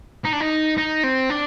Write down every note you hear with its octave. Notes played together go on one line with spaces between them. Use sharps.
D#4
D4
D#4
D#4
C4
D4